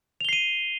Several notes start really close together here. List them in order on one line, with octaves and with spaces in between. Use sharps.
F7 G7 C7 D#7